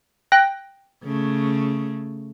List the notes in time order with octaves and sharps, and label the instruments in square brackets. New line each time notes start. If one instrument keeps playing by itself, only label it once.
[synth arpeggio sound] G5 F#6 A#6
[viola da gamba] C#3 A3